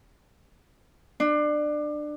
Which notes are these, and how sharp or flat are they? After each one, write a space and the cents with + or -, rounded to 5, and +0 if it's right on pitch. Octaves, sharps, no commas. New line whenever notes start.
D4 +25